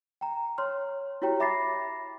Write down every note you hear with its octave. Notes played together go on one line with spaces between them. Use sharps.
G5 A#5
C#5 C6 F6
E4 F#4 G4 C#5 G5 A#5
E5 B5 D6 A6 A#6 C7